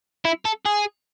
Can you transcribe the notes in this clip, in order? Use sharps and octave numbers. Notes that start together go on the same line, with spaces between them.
E4
A4
G#4